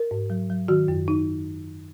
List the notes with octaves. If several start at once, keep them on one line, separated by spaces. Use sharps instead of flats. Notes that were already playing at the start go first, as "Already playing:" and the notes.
Already playing: A#4
G#2
F#3
F#3
D#3 F#4
F#2
D#4